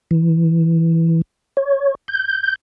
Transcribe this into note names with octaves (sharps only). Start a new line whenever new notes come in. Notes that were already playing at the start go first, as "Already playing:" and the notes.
E3
C#5
G6